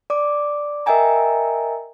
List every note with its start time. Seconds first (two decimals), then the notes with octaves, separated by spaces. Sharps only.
0.10 D5 D6
0.86 A#4 D#5 E5 G5 G#5 A#5